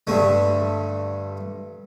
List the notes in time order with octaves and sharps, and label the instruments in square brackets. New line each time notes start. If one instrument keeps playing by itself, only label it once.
[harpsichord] G2 D3 A3